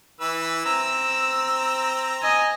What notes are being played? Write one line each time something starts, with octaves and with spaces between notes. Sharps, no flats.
E3 B4 E6
C4 A#5 E6
D#5 G#5